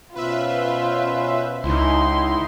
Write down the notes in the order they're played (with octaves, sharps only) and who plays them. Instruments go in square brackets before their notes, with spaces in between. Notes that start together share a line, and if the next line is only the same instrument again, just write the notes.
[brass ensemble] B2 C#4 C5 [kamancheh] F4 [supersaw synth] B4 E5
[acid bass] C#2 [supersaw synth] D#4 E4 [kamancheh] C6